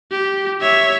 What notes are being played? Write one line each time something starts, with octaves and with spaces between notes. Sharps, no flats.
G4
C#5 E5